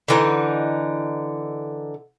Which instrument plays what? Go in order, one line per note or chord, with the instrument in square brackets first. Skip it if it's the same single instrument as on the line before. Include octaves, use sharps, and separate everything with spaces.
[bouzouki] D3 E3 D#4